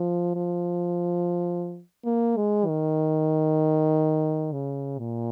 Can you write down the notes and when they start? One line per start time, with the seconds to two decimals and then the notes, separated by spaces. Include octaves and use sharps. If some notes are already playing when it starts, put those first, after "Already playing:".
Already playing: F3
0.35 F3
2.05 A#3
2.36 G#3
2.67 D#3
4.52 C#3
4.98 A#2